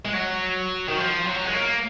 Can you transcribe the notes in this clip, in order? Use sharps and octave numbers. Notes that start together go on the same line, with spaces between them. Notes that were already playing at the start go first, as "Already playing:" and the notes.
G#3
F#3
D#3
F3
F#3
G#3
A#3